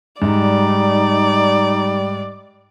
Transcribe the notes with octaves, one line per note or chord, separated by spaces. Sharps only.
G#2 G3 D#4 D5